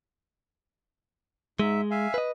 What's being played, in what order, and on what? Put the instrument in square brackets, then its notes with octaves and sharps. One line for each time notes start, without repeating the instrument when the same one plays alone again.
[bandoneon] G#2 E5 [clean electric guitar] G#3
[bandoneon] E5 F5 G#5
[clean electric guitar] B4 D#5